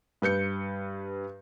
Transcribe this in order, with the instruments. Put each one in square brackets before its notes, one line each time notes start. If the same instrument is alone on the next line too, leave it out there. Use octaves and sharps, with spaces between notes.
[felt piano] G2 B4 G6 C#7